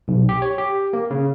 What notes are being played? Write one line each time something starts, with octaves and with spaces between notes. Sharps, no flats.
B1
G4
C#5
G4
A#3
C#3